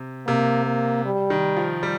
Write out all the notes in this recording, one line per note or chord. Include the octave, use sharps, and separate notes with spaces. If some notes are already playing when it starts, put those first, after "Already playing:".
Already playing: C3
C3 A#3
A#3
G3
D#3
F3
G3